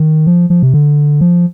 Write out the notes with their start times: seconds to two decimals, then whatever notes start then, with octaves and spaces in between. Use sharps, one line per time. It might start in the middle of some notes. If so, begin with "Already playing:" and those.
Already playing: D#3
0.27 F3
0.50 F3
0.63 C3
0.74 D3
1.21 F3